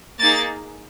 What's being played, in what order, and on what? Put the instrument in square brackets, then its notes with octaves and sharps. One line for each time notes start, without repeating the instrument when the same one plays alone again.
[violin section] A#3 D#4 G#4 A6